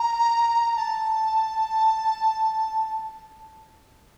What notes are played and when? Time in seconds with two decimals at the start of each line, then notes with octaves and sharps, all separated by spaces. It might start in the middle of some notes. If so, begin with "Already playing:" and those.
Already playing: A#5
0.76 A5